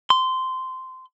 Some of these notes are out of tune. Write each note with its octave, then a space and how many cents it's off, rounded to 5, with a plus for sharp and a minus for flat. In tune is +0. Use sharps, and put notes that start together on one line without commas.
C6 -15